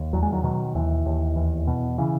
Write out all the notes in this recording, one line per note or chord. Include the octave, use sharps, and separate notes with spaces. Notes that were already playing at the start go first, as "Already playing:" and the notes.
Already playing: D#2
E2 F#3
G#3
D#3 F#3
B2 D#3 F#3
D#2 E3
D#2
E2
B2
C#3 E3